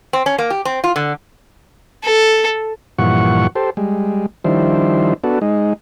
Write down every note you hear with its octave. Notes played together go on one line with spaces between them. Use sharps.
C4
C#4
A#3
G4
C4
F4
D3
A4
G2 A#2 E3 F3 F#5 C#6
G4 A4 C5
G3 G#3
D#3 F3 G3 D4 E4 C5
B3 D4 F#4 A4
G#3 D#4